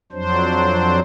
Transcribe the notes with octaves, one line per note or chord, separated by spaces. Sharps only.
F2 F#3 D4 C5